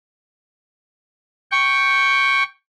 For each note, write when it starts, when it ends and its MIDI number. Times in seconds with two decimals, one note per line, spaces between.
1.51 2.43 79
1.51 2.43 85